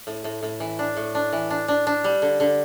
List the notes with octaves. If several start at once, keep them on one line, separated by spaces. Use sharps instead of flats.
A2
A2
A2
E3
D4
A2
D4
E3
D4
D4
D4
G3
D3
D3